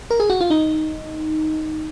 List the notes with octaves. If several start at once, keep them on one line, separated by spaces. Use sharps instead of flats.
A#4
G#4
F#4
F4
D#4